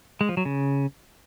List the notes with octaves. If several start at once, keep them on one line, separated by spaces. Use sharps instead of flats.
G#3
F3
F#3
C#3